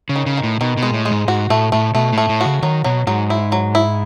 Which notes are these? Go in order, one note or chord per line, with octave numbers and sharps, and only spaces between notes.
C#3
D#3
C#3
D#3
A2
B2 D#3
B2
G#3
A2
G#3
G#2
G#2 F#4
A2 A3
A2 A3
B2 A3
A2
A3
A2
C#3 F#4
D#3 F#3
B2 F#3
G#2 F#3
E4
F#3
E4